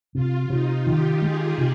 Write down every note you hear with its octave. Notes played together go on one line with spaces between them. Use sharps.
C3 F4
C3 D#4
D#3 G4
G#3 G#4
C3